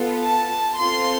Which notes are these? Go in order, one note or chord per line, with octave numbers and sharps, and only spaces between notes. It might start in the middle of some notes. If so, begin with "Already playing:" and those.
Already playing: B3 F4 A4
A5
C4 F4 A4 C6